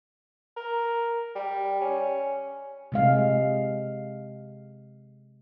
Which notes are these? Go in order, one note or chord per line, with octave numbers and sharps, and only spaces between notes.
A#4
G3
C#4
C3 G#3 F5